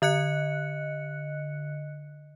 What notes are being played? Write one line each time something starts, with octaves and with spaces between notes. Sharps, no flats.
D3 D#5 F#6 C#7